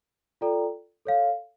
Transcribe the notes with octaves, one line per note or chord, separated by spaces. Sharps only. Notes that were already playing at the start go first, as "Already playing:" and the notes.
F4 A4 D5 G5 A#5
A4 C#5 F5